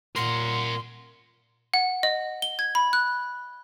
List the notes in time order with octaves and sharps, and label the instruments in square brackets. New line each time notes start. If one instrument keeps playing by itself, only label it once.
[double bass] A#2 [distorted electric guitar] A#4 F#5 [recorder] C6
[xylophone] F#5
D#5
G7
G#6
B5
F#6